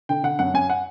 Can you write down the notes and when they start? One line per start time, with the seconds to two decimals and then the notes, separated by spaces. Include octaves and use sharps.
0.09 D3 G5
0.23 D3 F#5
0.39 F#2 F#5
0.54 F#2 G#5
0.70 F#5